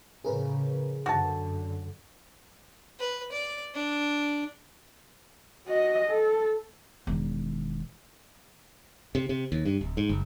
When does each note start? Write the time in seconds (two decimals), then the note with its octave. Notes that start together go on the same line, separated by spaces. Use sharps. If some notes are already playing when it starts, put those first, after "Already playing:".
0.25 A2 C#3 F3 G#4 A#4 B4
1.06 F#2 D3 F#4 A5
2.99 B4
3.32 D5
3.74 D4
5.67 F#4 D#5
6.09 A4
7.07 E1 D#3
9.15 C3
9.29 C3
9.52 D#2
9.65 G2
9.81 D1
9.97 G#2
10.09 F#1